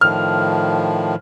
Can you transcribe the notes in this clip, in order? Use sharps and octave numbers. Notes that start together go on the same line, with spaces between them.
A2 D#3 F3 F6